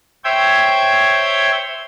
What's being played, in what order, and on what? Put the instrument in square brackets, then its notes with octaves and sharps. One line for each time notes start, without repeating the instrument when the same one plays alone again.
[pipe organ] C5 C#5 E5 G5 G6 G#6